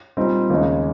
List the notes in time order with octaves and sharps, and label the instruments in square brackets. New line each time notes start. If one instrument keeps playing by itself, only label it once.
[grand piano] A#2 G3 C4 D#4
D#2 C#3 G#3 D#4